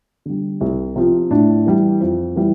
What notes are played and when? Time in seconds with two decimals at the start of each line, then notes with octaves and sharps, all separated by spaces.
0.26 D3 G3
0.61 C2
0.96 C3 F3
1.30 A2 D4
1.66 E3 G3
2.01 F2
2.36 E3 G3